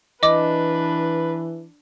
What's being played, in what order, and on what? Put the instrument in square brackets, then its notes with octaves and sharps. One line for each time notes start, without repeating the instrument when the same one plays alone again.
[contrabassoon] E3 [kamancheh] D4 B4 [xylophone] D#5 D6